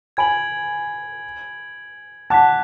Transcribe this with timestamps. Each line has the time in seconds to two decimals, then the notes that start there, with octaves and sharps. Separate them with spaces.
0.17 G#5 B5 G#6 D7 F#7
2.30 F#5 A5 D6 F#6 B6